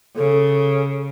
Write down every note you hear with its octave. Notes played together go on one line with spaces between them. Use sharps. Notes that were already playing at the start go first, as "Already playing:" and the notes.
C#3 A4